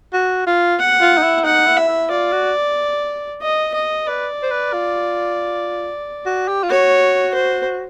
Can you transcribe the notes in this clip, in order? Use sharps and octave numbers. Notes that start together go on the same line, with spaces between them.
F#4
F4
F#5
F4
D#4
E4
D#4 F#5
E4
E5
E4
F4 D5
F#4
D#5
D#5
B4 D5
C5
B4
F4
F#4
G4
F4
F#4 C#5
C5